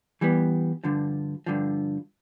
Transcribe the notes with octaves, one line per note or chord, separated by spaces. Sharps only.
E3 G3 B3
G2 D3 F3
G2 D3 F3